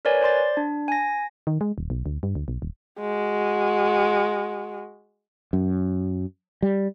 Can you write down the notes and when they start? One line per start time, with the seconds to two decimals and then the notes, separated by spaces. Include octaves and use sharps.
0.05 A#4 B4 C#5 D5 G#5
0.21 C5 D5 C6 A6
0.57 D4
0.88 G#5 A#6
1.47 D#3
1.61 G#3
1.78 D#1
1.90 B1
2.06 D2
2.23 G2
2.35 D2
2.48 B1
2.62 D#1
3.00 G#3 F#4
5.53 F#2
6.62 G3